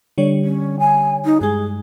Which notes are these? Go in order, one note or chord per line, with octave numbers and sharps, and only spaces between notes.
D3 G3 C#5
C#4
G#5
D#4
G2 G#3 G#4